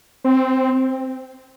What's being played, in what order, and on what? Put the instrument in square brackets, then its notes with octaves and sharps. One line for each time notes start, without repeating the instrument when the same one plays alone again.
[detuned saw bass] C4